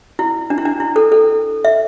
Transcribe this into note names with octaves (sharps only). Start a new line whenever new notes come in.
E4
D4
E4
D4
E4
A4
A4
E5